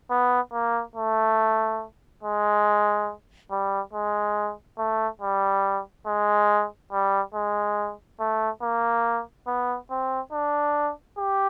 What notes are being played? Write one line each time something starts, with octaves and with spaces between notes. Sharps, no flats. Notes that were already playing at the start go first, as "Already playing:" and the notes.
B3
A#3
A3
G#3
G3
G#3
A3
G3
G#3
G3
G#3
A3
A#3
B3
C4
D4
G4